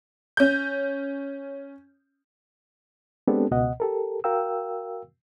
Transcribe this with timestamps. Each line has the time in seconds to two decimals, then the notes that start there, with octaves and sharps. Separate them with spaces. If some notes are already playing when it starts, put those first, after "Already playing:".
0.37 C#4 G6
3.27 G#3 B3 C4 D4 G4 A4
3.51 C#2 B2 D#5 F#5
3.80 G4 A4 A#4
4.24 F#4 A#4 F5 G5 E6